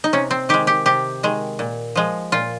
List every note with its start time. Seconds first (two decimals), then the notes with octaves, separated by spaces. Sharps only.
0.04 D#4
0.13 C3 C#4
0.31 C4
0.49 D#3 G#3 G4
0.67 G4
0.86 C3 G4
1.23 D#3 G#3
1.59 A#2
1.95 F3 G#3
2.32 A#2 F4